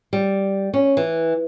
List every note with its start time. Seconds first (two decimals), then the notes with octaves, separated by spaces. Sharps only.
0.13 G3
0.74 C#4
0.97 E3